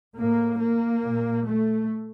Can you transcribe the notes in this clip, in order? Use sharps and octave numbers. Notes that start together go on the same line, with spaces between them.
A2 A#3
A#3
A#2
A3